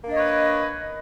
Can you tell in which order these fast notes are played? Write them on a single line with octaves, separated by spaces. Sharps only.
A#3 D4 D#5 C#5 B4